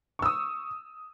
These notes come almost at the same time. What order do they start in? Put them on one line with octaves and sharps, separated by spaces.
C#6 E6 D#6